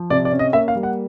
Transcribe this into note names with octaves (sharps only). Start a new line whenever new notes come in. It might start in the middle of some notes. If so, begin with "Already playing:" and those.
Already playing: F3
C3 D5
D5
C#4
D#5
A#3 E5
F5
G3
F#5